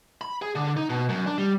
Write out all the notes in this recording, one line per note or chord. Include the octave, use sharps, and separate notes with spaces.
B5
G#4
D3
D#4
B2
F#2
D4
G3